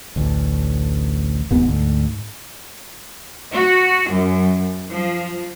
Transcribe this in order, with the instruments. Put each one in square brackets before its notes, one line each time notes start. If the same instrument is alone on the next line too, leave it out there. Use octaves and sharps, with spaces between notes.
[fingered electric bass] A1 D2
[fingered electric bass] F1 D#2 B3 [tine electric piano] G#2
[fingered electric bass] D2
[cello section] F#4
F#2
F3